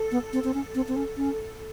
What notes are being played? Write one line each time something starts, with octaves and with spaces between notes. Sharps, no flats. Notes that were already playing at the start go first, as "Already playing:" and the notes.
Already playing: A4
B3
C4
C4
C#4
C4
C4
C#4
C#4